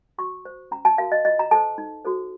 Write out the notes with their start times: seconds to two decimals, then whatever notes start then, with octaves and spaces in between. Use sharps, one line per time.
0.18 F#4 C#6
0.45 C5
0.71 C#4 A#5
0.85 A5
0.98 F#4 A#4 F5
1.12 D#5
1.25 F4 D#5
1.39 A#5
1.51 A4 C5 A5
1.78 D#4
2.04 F#4 A4 C5